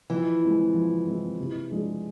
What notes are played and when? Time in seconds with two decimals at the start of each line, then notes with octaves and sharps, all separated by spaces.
0.10 E3 F3
0.42 G#3 C4 E4
0.74 F3
1.06 G#3 C4 E4
1.39 C3
1.70 F3 G#3 D4 G#4